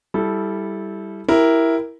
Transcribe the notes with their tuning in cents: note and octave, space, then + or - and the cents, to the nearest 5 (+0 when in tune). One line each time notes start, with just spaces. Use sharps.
G3 +0 E4 +0 A4 -15
E4 +0 G4 +0 A#4 +5